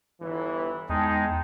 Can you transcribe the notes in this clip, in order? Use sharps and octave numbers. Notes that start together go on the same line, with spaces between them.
G1 E3
E2 G#3 D#4 G5 A5